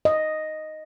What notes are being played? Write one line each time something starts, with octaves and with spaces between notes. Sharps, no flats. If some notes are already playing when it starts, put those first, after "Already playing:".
D#5